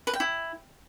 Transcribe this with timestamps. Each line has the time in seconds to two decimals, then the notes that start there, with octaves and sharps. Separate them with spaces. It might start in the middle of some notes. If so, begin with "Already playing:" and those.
0.07 B4
0.13 G5
0.20 E4